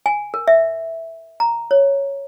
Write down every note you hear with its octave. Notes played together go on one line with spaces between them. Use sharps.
G#5
A#4
E5
A#5
C#5